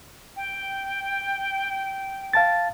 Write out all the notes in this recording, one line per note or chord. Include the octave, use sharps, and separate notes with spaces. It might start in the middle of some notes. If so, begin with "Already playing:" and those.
G5
F5 A5 A6